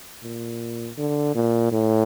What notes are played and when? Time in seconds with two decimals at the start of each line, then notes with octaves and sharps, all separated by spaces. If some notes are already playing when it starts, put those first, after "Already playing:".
0.23 A#2
0.98 D3
1.35 A#2
1.72 A2